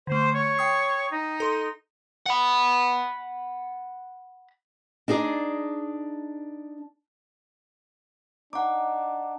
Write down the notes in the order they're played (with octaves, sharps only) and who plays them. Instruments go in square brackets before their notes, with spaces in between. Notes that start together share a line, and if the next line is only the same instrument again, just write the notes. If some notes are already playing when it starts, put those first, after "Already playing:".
[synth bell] D3 A3 [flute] C5
[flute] C#5
[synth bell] G5 D#6 C7
[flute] D#4
[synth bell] A4 C6
[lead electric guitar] F#5 B5
[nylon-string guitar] D4 D#4 G#4 D5
[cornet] D4 [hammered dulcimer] D#4 [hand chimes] F#5 D6